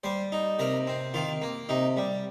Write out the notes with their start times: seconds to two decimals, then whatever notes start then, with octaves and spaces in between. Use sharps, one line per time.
0.04 G3 C5
0.32 D#4
0.59 C3 A#4
0.87 C4
1.14 D#3 F4
1.42 A#3
1.69 C3 D#4
1.97 G3